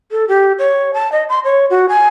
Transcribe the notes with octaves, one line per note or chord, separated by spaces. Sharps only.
A4
G4
C#5
A5
D#5
C6
C#5
F#4
G#5